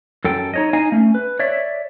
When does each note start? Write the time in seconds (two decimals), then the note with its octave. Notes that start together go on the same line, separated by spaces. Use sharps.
0.24 F#2 A4 G5
0.54 D#4 C#5 D#5
0.73 D#4 D#5 F5 G#5
0.92 A3 C#4
1.15 B4
1.39 C#5 D5 E5